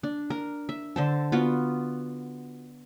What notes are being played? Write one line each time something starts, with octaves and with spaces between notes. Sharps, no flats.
D4
A#4
E5
D3 C5 A5
B3 F4 F#4